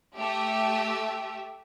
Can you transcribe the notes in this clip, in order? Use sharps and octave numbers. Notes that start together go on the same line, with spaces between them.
A3 G4 E5